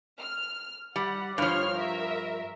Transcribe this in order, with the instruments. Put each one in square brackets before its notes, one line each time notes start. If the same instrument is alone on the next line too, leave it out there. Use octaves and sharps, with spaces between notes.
[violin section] F6
[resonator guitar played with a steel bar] G3 [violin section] F#5
[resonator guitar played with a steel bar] G2 F3 [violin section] C#5 C6 F6
[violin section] A#4 E5